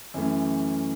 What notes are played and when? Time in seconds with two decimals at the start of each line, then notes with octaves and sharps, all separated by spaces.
0.14 F#2 E3 A3 C#4